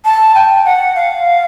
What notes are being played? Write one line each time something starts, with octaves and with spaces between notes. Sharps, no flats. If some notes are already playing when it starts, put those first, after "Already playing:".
A5
G5
F#5
F5